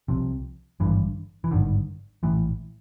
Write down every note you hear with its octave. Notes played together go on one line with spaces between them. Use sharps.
C2 C3 F3
G#1 G2 D3 E3
E3
G#1 G2 D3 D#3
A#1 A2 E3